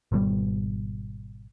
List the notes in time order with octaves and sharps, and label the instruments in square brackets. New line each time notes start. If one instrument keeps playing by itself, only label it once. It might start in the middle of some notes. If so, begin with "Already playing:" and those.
[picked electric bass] G#1 B2 G3